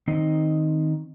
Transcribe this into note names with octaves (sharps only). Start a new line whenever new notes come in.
D#3 C4 D#4 D#5